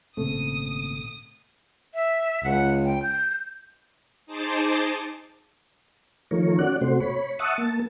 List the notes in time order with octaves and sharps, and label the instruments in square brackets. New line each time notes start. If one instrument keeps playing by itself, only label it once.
[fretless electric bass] G#1 A#2 C#3 [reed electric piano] A3 C4 A4 [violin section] D#6
[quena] E5
[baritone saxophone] C#2 [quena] F#5
[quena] G5
G6
[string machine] D#4 G#4 C5 A5 D6
[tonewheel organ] D#3 F3 A3 A#4 C#5
C#4 F#4 D5 F#5
C3 A3 F#4 C5
C#5 B5
E5 F#5 A5 C#6 D#6
A#3 A5